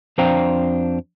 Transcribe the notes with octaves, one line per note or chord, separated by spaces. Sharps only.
F2 D4 C5 F5 G5 A#5